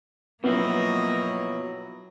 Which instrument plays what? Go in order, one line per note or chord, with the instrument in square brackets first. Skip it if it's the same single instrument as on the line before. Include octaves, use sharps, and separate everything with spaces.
[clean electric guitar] B2 F3 E4 [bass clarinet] F#3 [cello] A#3 D#5 [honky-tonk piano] B3